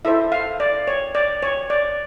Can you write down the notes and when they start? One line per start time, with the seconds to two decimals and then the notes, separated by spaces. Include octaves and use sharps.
0.05 E4 A4 C5 E5
0.32 F5
0.60 D5
0.87 C#5
1.15 D5
1.43 C#5
1.70 D5